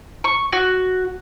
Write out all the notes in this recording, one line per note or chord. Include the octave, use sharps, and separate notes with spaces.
C#6
F#4